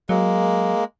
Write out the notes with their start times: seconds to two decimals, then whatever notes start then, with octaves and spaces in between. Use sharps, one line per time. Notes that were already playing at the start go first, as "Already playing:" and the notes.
0.09 F#3 G#3 A#3